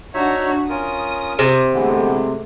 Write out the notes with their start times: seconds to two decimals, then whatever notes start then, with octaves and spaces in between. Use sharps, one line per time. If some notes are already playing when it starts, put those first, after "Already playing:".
0.14 D4 D#4 F#4 C#5 E5
0.70 C#4 F4 A#4 D#6
1.39 C3
1.74 D3 E3 G#3 A3 B3